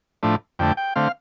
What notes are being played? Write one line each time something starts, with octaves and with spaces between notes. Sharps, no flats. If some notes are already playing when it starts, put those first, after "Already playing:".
A2 F3 A3 D4
F2 D3 A3 G5
G5
D3 A3 C4 F5